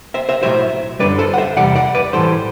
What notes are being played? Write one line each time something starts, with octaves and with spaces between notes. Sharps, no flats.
C5 E5
C5 E5
B1 A2 F#3 C5 E5
F#2 D3 G3 B4 D5
A4 C5
F#5
C5 E5
E2 C3 G3 D5 F#5
D5 F#5
B4 D5
A2 E3 G3 A4 C5